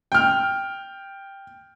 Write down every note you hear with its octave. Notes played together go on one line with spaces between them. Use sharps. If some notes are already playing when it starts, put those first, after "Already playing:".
G5 F6